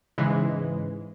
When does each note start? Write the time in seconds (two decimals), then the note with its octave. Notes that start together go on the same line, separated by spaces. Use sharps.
0.18 G#2 C#3 E3 G#3